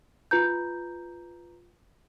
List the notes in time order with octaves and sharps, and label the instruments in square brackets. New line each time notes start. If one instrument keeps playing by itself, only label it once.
[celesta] F4 B4 A#5 G6